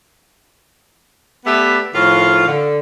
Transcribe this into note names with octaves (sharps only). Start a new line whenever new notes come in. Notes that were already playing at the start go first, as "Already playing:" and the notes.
A3 B3 G4 B4 D5 E5
A2 D#3 F3 F4 F#4 F5
D3